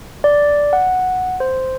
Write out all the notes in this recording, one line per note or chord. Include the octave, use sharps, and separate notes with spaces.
D5
F#5
C5